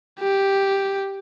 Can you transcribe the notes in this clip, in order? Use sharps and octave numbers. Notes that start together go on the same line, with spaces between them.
G4